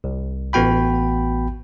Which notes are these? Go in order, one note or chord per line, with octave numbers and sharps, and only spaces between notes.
C2
A1 B3 F#4 G5 B5